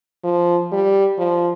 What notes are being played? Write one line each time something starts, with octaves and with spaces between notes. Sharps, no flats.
F3
G3
F3